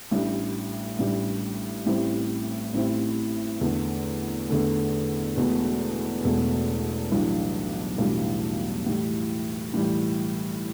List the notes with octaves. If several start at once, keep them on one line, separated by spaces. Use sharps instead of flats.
A1 A2 G3 D4
A1 A2 G3 D4
A1 A2 G3 C4 E4
A1 A2 G3 C4 E4
E2 D3 A3
E2 D3 A3
E1 E2 B2 A3
E1 E2 B2 A3
B1 A2 E3 G3 D4
B1 A2 E3 G3 D4
A2 E3 G3
A2 E3 G3